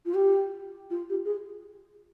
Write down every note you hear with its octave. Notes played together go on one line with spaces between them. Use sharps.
F4
G4
F4
G4
G#4